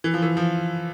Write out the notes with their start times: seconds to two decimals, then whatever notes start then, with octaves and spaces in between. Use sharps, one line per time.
0.04 E3
0.14 F3
0.22 E3
0.37 F3